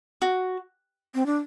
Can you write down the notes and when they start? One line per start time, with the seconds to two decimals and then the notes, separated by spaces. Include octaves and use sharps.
0.22 F#4
1.15 C4
1.26 D4